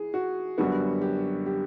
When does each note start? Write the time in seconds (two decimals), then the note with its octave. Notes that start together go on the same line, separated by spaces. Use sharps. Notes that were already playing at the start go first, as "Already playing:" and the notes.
Already playing: E3 G#4
0.14 F#4
0.58 F#2 D3 G3 B3 F#4
1.01 G4
1.46 G4